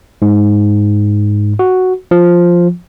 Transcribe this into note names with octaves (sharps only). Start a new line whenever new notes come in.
G#2
F#4
F3